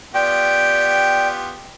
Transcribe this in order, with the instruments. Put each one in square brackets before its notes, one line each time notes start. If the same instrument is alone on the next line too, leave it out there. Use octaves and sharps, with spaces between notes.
[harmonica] B3 F4 G4 [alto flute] D5 [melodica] G5